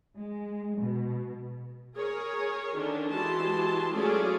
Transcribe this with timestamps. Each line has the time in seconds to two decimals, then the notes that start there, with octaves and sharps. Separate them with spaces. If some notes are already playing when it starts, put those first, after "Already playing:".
0.17 G#3
0.80 B2
1.96 G#4 A#4 C#5
2.77 D3 D#3 C#4 D4
3.12 E3 G#3 F#4 G4 A5 C6
3.93 F#3 A3 C#4 F4 G#4 D5